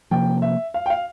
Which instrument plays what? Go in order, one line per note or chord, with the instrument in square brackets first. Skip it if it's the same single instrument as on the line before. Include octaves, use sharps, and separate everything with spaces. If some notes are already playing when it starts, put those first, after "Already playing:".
[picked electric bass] C3 F3 A#3 [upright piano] G5
[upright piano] E5
F5
G5
F5